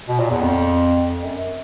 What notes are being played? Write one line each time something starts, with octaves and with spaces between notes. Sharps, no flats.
B2
A#2
E2
F2
F2
F#2